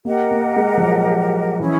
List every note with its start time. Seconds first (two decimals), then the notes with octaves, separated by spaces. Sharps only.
0.05 A#3 G4 A#4 D#5 F#5
0.31 A#3
0.56 G#3
0.77 F3
0.83 F#3
1.60 E3 C#4 E4 G#4